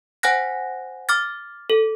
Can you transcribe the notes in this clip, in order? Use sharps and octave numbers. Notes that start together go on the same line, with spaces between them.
C5 F#5 G#5 F#6 A#6
D6 F6 A6
A4